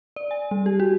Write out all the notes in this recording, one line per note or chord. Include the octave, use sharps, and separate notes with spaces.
D5
G#5
G3
G4
F#4